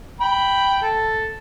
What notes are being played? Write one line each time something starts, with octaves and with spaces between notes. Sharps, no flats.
G5 B5
A4